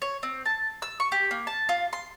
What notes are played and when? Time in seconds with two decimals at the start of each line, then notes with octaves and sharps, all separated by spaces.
0.02 C#5
0.23 C4
0.45 A5
0.82 E6
1.00 C#6
1.12 G4
1.31 A#3
1.47 A5
1.69 F4
1.93 C6